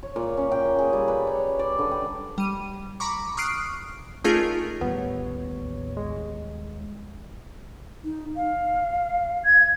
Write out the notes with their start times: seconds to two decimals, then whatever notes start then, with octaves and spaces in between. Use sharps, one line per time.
0.03 C#5
0.16 A#2
0.37 C#4
0.52 G5
0.65 A#3
0.79 G#4
0.93 G3
1.08 B4
1.27 C#5
1.59 D5
1.79 D3
1.91 G5
2.38 G3 D#7
3.00 A#5 B5 C#6 D6
3.37 C#6 D#6 F6 F#6 C7 D7
4.24 A3 C#4 D#4 F4 G#4 A#4
4.81 A1 D#2 A2 G3 B3 C#5
5.97 G#3
8.04 D#4
8.36 F5
9.45 G#6